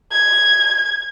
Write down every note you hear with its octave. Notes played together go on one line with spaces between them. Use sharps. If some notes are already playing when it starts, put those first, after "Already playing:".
G#6